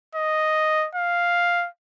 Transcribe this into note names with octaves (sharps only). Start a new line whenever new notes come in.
D#5
F5